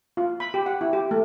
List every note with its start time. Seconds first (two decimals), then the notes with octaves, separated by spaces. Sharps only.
0.17 F4
0.40 B5
0.54 G4
0.66 F#5
0.81 E4
0.93 G4
1.11 A3